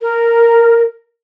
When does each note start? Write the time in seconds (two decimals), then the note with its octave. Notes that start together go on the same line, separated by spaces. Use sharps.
0.01 A#4